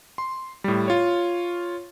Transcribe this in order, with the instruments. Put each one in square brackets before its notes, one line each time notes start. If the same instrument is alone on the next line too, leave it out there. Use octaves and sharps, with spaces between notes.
[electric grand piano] C6
A2 G3
F4 C#5